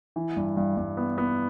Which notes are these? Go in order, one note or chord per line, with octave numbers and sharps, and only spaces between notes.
E3
G2
G2
G2
B3
B3